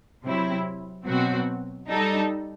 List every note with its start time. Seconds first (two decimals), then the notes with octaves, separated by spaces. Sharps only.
0.23 C3 F#3 C4 E4
1.06 B2 F#3 C4 F#4
1.88 G3 D#4 A4